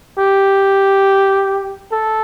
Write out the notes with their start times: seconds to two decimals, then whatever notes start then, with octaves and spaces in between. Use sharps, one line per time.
0.18 G4
1.92 A4